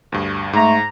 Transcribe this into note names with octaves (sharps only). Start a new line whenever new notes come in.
D2 G2
G#2 A3 A#5